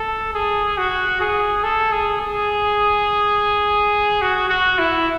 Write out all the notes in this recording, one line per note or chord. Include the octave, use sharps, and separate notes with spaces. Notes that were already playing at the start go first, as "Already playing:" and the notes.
Already playing: A4
G#4
F#4
G#4
A4
G#4
G#4
F#4
F#4
E4